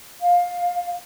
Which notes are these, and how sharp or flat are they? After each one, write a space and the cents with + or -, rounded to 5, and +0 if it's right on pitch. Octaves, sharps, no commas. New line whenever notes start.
F5 +20